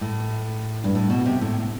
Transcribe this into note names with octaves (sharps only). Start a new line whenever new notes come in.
A2
G2
A2
B2
C3
A2